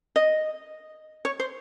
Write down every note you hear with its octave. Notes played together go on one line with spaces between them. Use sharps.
D#5
C#5
C5